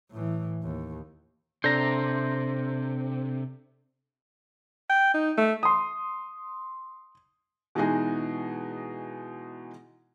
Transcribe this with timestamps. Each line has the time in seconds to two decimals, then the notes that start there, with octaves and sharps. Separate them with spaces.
0.11 A2 E3
0.63 D#2
1.64 C3 D4 A4 C5 A#5
4.89 G5
5.14 D#4
5.37 A3
5.63 C6 D#6
7.75 B2 E3 G#3 D#4 F#4 G#4